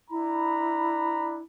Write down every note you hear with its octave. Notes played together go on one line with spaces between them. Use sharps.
D4 E4 A#5 B5